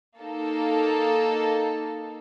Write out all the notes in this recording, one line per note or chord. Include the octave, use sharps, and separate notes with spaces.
A#3 D#4 A4